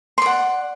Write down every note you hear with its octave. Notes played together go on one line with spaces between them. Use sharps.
D5 F#5 C6